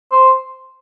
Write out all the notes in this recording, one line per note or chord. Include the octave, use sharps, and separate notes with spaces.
C5